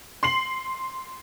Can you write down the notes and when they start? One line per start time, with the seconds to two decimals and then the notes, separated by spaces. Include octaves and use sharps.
0.23 C6 C7 F#7